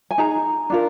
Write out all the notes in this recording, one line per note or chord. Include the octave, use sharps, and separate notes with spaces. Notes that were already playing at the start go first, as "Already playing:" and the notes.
G#5
D#4 G#4 A#5
D4 F4 A#4